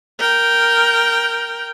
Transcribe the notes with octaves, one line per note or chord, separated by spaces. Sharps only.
A#4 G5